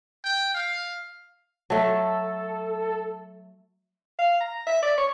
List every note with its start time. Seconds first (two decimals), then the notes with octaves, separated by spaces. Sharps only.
0.24 G5
0.54 F5
1.70 F#3 A3 A4
4.18 F5
4.41 A#5
4.67 E5
4.83 D5
4.98 C#5